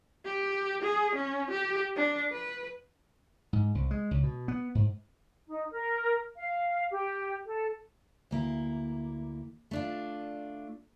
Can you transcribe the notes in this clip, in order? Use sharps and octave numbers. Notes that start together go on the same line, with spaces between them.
G4
G#4
C#4
G4
D4
B4
G#2
C2
G#3
C#2
B2
B3
G#2
D#4
A#4
F5
G4
A4
D2 A#3 E4
A3 D4 F4